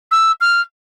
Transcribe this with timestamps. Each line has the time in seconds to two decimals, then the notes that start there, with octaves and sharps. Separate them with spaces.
0.11 E6
0.41 F6